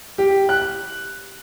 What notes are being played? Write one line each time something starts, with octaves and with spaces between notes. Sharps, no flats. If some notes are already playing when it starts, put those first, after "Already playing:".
G4
F#6